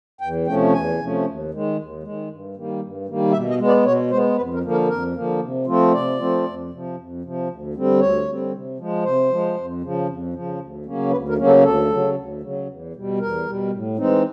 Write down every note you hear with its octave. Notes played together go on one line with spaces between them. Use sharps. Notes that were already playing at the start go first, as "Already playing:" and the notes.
E2 G5
C3 F3 A3 C#4 G5
E2 G#5
C3 F3 A3 C#4
D#2
D#3 G#3
D#2
D#3 G#3
G2
D#3 G3 A#3
G2
D#3 G3 A#3
B2 E5
D#5
G#3 B3
D5
B2 C#5
G#3 B3 C5
F2 B4
A#4
D3 F3 A#3
A#4
F2 A#4
D3 F3 A#3
C3
F3 A3 C4 F4
C3 D5
F3 A3 C4 F4
F2
C3 F3
F2
C3 F3
D2
D3 G3 C4
D2 C#5
D3 G3 C4
C3
F3 G#3
C3 C5
F3 G#3
F2
C#3 F3
F2
C#3 F3
D2
C#3 F#3 A#3 C#4
D2 B4
A#4
C#3 F#3 A#3 C#4
A4
D2 A4
C#3 F#3
D2
C#3 F#3
E2
B2 G3
E2 A#4
B2 G3
A2
E3 G#3 C4 D#4